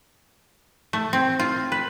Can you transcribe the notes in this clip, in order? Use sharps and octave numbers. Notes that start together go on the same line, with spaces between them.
A3
C4
F4
B4